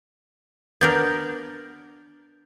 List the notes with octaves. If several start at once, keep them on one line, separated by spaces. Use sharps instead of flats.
B3 D4 A#4 G6